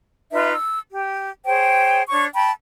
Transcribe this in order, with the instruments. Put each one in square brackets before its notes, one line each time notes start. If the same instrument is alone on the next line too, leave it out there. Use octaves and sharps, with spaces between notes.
[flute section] D#4 F4 B4 E5
E6
G4
G#4 C5 C#5 G5
D4 C#5 C#6
G5 A5 B5